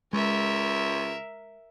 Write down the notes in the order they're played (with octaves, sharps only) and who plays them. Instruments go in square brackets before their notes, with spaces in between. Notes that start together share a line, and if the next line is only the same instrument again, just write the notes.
[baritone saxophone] C#2 [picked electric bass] G#3 [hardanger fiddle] A#4 E5